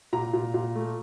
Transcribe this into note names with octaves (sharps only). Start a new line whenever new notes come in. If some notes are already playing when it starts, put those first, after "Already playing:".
A#2 A#5
A#2
A#2
A3